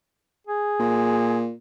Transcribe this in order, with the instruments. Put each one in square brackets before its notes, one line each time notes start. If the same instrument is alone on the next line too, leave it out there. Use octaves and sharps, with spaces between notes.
[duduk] G#4
[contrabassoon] A#2